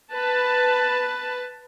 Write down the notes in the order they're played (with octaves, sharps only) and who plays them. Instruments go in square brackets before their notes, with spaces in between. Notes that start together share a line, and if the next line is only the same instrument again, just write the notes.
[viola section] B4 A5